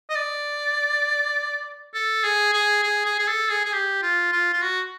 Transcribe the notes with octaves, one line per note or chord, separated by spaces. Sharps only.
D#5
D5
A4
G#4
G#4
G#4
G#4
G#4
A4
G#4
G#4
G4
F4
F4
F4
F#4